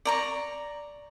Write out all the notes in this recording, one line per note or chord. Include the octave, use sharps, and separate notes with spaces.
D5 A#5 C#6